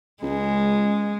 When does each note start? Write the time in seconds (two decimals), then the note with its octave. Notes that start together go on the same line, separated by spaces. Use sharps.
0.23 C#2 G#3